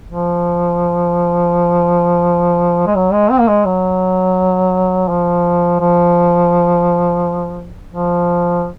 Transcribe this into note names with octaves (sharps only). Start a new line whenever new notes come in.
F3
G#3
F#3
G#3
C4
A#3
G#3
F#3
F3
F3
F3